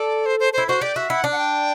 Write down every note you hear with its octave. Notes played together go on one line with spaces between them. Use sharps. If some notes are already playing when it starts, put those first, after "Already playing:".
Already playing: A4 D5
C5
C5
E4 C5
F#4 C5
G4 D5
F#4 E5
E4 F#5
D4
F#5
G5